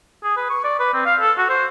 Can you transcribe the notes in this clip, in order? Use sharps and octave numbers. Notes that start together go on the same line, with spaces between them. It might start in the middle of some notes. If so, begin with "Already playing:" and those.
G#4
B4
C#6
D5
B4
C4
F5
A4
F#4
C5